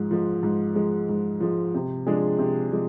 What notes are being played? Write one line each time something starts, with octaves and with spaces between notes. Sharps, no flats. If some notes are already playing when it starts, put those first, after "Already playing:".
Already playing: G#2 F3 G#3
F3 G#3
G#2
F3 G#3
G#2
F3 G#3
C3
F3 G#3 D4 G#4
C3
F3 G#3